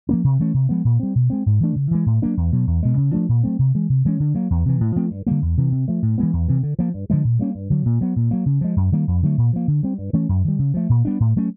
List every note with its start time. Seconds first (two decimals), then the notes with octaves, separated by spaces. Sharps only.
0.09 F3 A#3 C#4
0.24 C3
0.39 E3 A3 C#4
0.54 C3
0.69 F3 G#3 B3
0.85 A#2
1.00 G3 C4
1.15 B2
1.30 G#3 C4
1.46 G#2
1.60 E3 A3 D4
1.76 C#3
1.91 E3 G#3
2.06 A2
2.22 F#3 A#3 D4
2.37 E2
2.52 B2 F#3
2.67 E2
2.83 B2 G#3
2.97 C#3
3.13 F3 A3 D4
3.29 A#2
3.43 F#3 A3 C4
3.59 C3
3.74 E3 G#3
3.89 C3
4.05 E3 G#3 C#4
4.20 D3
4.35 F#3 A#3
4.50 E2
4.66 C3 E3
4.81 A2
4.96 F3 A3 C4
5.11 G2
5.27 D3 G3 A#3
5.42 E2
5.57 C3 E3
5.72 C3
5.88 F3 A3
6.02 A2
6.18 E3 G#3 B3
6.33 E2
6.48 C3 E3
6.63 D3
6.79 F3 A#3
6.94 G2
7.10 D3 F3 G#3
7.24 A#2
7.39 G3 A#3 C#4
7.55 G2
7.70 D3 F#3
7.86 A#2
8.01 F#3 B3
8.16 A#2
8.31 F#3 A#3
8.46 C#3
8.61 F3 G#3
8.76 F#2
8.92 D#3 G3 A#3
9.08 F2
9.23 D3 F#3 A3
9.38 A#2
9.53 F3 A#3
9.68 D3
9.83 G3 C4
9.98 G2
10.13 E3 A3 C#4
10.29 F#2
10.44 D#3 G3
10.59 C#3
10.74 F3 A3
10.89 A#2
11.05 G3 B3 D4
11.20 A2
11.36 F#3 A3 C#4